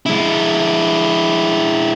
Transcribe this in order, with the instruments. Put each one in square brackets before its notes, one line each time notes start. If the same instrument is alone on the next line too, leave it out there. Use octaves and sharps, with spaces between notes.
[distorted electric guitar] G#3 E4